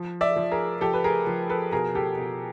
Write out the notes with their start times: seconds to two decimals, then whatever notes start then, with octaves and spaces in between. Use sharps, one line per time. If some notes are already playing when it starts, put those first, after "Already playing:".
Already playing: F3
0.21 D5 E5
0.36 F3
0.51 G#4 A#4
0.81 F3 G4 A4
0.93 B4
1.04 G#4 A#4
1.27 F3
1.49 A4 B4
1.72 B2 G#4 A#4
1.95 G4 A4
2.18 B2